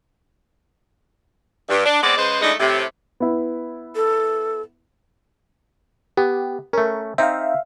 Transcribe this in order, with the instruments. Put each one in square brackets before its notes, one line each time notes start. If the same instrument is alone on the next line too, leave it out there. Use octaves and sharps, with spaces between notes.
[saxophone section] G2
D4
G#3 B3 C4 D5
C#3 G#3 B4 C5
E3 G#3 A3 D4 D#4
A2 C3
[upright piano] B3 E4
[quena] A4
[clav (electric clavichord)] B3 [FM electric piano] G4
[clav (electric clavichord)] A3 C#4 [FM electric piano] A#4
[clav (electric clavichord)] C4 D#4 [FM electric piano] E5 F5